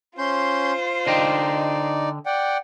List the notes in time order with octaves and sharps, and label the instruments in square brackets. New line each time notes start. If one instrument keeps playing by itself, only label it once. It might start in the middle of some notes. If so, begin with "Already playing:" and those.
[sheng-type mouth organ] C#4 C6 G6 [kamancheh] F4 C5
[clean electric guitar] D3 D#5 G5 [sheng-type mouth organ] D#4 D5
[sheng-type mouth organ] D5 F#5 G5